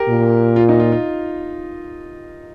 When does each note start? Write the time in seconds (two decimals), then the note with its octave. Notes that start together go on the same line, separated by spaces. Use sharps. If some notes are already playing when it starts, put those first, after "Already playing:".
Already playing: G4 A#4
0.09 A#2
0.56 F4
0.69 D#4
0.80 F4
0.92 F4